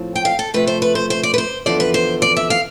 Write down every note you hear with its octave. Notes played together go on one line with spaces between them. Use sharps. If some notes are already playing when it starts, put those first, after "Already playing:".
Already playing: A2 F3 C4
G5
F5
A4
C3 F3 A3 B4
C5
B4
C5
C5
D5
B4
C5
E2 D3 F3 D5
B4
C5
D5
E5
F5